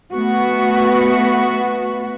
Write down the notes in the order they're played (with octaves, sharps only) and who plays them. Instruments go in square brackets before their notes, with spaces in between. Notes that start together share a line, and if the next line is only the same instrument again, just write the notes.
[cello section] A3 B3 F#4